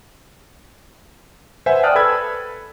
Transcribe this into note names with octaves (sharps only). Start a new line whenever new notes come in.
B4 C5 E5 F#5 G#5
D5 G5 A5 D#6 F6 F#6
A4 B4 B5 E6 G#6